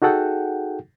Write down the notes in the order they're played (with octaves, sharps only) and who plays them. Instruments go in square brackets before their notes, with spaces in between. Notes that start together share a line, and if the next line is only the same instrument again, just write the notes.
[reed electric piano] D#4 F#4 G#4 A4 F#5 G5